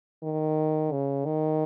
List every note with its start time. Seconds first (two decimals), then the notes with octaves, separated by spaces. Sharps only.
0.23 D#3
0.92 C#3
1.26 D#3